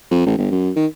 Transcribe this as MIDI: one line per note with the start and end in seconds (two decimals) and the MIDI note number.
0.11 0.25 41
0.26 0.34 33
0.38 0.47 31
0.51 0.71 42
0.76 0.87 51